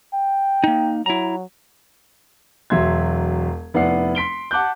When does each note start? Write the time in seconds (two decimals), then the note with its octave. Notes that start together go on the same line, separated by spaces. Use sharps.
0.14 G5
0.64 A#3 D#4
1.06 F#3 E4 A#5
2.70 E1 F#3 E5 C6 G#6
3.74 F1 B3 E4 D5 F#5 C7
4.15 C6 B6 D7 G7
4.51 F#5 A5 D6 F#6 G6